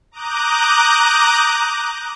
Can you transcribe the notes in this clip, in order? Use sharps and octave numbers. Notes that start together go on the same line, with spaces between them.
A#5 D6 D#6 F#6 G6